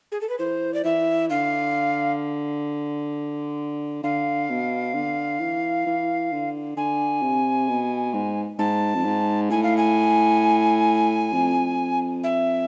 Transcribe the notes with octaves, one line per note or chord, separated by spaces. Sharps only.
G#4
A4
B4
E3 C5
D5
E3 E5
D3 F5
D3 F5
B2
D3
E3
E3
D3
D3 G#5
C3
B2
G#2
G#2 A5
F2
G#2
A2 G#5
F5
G#5
F2
E5